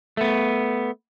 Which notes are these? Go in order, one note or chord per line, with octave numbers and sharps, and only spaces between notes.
A3 B3